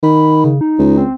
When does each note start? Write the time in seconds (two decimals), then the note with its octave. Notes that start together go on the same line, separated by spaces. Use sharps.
0.03 D#3 B5
0.44 C#3
0.61 D#4
0.79 C#2
0.97 C4